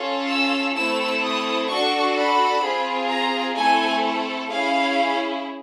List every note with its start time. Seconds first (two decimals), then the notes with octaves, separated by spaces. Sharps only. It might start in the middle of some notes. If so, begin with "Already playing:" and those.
Already playing: C#4 F4 A4
0.28 E6
0.75 A3 C4 E4 A4 E6
1.23 D#6
1.69 D4 F#4 A4 C#6
2.16 B5
2.63 C4 F4 G#4
3.09 A#5
3.56 A3 C4 E4 A4 G#5
4.49 C#4 E4 G#4 F5